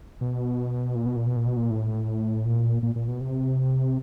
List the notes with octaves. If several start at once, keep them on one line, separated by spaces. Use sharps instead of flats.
B2
A#2
B2
A#2
B2
A#2
B2
A#2
A2
A#2
A#2
A#2
B2
C3